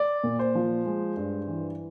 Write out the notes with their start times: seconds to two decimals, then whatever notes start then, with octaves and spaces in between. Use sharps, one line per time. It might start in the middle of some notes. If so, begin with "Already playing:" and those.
Already playing: D5
0.24 A#2
0.39 C5
0.55 F3
0.86 G#3
1.17 G2
1.47 E3